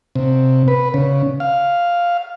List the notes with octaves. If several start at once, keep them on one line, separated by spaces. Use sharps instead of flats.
C3
B4
C#3
F5